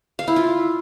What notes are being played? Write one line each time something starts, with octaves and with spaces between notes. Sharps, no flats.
F5
E4
F4